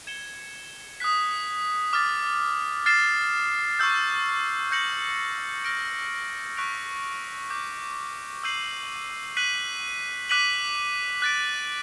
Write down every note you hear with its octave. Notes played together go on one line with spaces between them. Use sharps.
G#6 C#7 E7 G7
D#6 F#6 B6
D6 F6 A6
F6 A6 C7 E7
C#6 E6 G6
G6 A#6 C#7 F#7
F6 A#6 D7
C#6 F#6 B6 D7 F7
D6 G6 B6
E6 G6 C7 D#7 F#7
F#6 B6 D#7 F#7
D6 F#6 B6 D#7 F#7
F#6 A6 D7